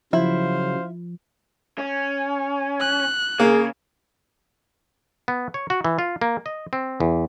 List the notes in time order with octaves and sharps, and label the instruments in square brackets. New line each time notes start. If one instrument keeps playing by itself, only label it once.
[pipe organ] C#3 F#3 [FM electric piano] F3 [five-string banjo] E4 [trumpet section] C5 F5
[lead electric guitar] C#4
[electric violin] F#6
[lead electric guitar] C#3 [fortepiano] A#3 [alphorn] G#4
[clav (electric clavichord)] B3
C#5
F#4
E3
F4
A#3
D#5
C4
E2